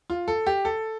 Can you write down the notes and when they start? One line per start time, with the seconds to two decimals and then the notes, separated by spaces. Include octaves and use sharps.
0.10 F4
0.28 A4
0.47 G4
0.65 A4